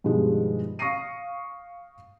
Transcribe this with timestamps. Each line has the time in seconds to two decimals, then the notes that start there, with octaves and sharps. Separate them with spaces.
0.04 G2 B2 D#3 F3 G3 G#3
0.79 F5 C#6 D#6 A#6 C7 D#7